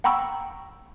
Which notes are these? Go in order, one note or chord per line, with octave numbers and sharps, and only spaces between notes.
F#5 G5 A#5 B5 C#6 E6